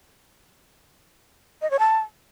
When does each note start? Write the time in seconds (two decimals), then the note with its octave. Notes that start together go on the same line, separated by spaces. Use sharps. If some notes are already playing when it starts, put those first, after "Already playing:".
1.62 D#5
1.71 C#5
1.79 A5